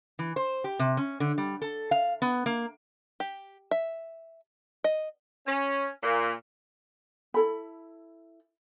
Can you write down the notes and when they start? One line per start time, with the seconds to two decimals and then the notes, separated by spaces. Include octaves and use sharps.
0.19 E3
0.36 C5
0.64 G4
0.79 C3
0.97 C#4
1.20 D3
1.38 G3
1.62 A4
1.91 F5
2.22 B3
2.46 A#3
3.20 G4
3.71 E5
4.84 D#5
5.46 C#4
6.02 A#2
7.34 E4 A4 B5